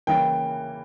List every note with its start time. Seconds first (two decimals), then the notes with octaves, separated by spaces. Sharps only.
0.07 C#3 E3 A#3 G5